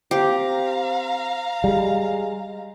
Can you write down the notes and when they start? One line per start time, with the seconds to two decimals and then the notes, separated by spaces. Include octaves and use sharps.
0.11 C4 G4 F5 A#5
1.64 G3 G#3